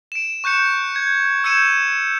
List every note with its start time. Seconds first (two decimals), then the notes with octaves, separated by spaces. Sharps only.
0.12 D7 E7
0.44 C#6 F#6 G6 C#7 E7
0.96 G#6
1.44 E6 G6 G#6 C#7 D#7 E7